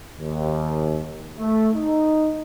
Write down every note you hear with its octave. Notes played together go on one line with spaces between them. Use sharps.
D#2
A3
D#4